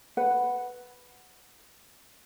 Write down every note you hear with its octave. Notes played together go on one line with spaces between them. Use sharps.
B4 F#5